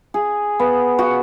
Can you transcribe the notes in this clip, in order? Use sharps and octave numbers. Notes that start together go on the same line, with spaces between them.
G#4
B3
F#4